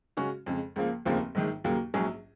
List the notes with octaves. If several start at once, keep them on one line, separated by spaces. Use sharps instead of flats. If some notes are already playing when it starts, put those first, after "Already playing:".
C#3 G#3 C#4 F#4
F2 C#3 G#3
C#2 C#3 F3 A#3
F1 D#2 C#3 F3 A#3
A#1 G#2 D#3
D#2 C#3 F#3 A#3
A#1 G#2 F#3 C#4 G#4